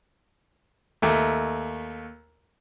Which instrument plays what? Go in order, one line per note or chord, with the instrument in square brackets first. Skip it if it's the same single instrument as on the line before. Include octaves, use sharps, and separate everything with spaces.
[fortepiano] D#2 A3